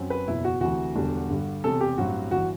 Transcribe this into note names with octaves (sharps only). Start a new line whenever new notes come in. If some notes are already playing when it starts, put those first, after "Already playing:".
Already playing: F#2 F#3 C4
B4
F#1 E2 B2 E4
F#4
D2 C3 E3 F#4
E1 E2 D3 G3 D4
G2 D3 G3
E1 E2 C3 A4
G4
A1 G2 F#3 C4 F#4
G1 E3 F#4